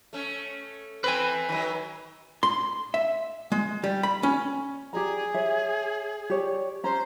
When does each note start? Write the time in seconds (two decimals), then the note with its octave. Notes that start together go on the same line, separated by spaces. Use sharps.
0.13 A3 C#4
1.04 C4 B4 G#5
1.49 D#3 F#3
2.43 C6
2.94 E5
3.52 G#3
3.84 G3
4.03 B5
4.23 C#4
4.93 G4 G#4 D5 A#5
5.34 C#5 E5
6.30 G4 C#5 D5
6.84 C#4 C5 A#5